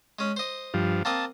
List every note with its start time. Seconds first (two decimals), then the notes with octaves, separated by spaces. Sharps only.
0.19 G#3 C#4
0.37 C5 D#5
0.74 G2 F3
1.05 A#3 C4 D#5 A5